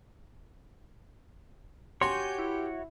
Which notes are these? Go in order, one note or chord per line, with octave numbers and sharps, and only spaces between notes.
F#4 G4 C#5 G#5 C6 G6
E4